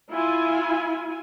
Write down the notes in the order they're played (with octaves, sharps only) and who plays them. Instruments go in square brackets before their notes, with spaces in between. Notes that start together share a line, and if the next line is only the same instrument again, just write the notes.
[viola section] E4 F4 G#5